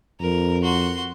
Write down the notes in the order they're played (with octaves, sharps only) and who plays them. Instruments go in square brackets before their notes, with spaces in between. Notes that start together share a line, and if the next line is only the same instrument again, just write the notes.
[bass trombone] F2 [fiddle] A#4
[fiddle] F#4 C6